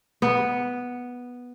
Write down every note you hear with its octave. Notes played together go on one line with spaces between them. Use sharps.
B3